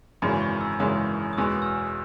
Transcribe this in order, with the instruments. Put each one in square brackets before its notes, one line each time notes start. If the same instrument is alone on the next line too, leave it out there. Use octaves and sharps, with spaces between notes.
[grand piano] G#1 F#2 C#3 E3 G#3 [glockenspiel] B5
[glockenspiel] C#6
E6
[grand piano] G#1 F#2 C#3 E3 G#3 [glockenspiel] D#6
[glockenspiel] D#6
[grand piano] E2 B2 G#3 B3 [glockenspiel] E6
[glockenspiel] E6
F6